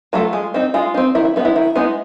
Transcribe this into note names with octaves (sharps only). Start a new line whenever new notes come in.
F#3 A3 F4
G#3
C4 D#4
G#3 F4
C4 D#4
D#3 E4
E4
G#3 B3 D#4
E4
D#3 E4
G#3 B3 D#4 E4